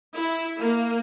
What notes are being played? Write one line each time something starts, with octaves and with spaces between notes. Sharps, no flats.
E4
A#3